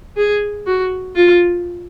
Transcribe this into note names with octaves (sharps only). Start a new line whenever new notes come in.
G#4
F#4
F4